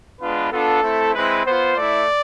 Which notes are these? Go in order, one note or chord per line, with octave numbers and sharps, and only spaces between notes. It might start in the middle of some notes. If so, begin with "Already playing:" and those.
G#3 B3 D4 F4 B4
B3 D4 F4 A4
A3 C4 E4
G#3 C4 E4 B4
B3 F4 C5
A3 E4 D5